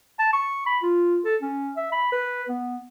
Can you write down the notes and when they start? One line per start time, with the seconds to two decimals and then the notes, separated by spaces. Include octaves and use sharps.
0.19 A5
0.33 C#6
0.66 B5
0.83 F4
1.25 A4
1.42 C#4
1.76 E5
1.92 B5
2.12 B4
2.49 B3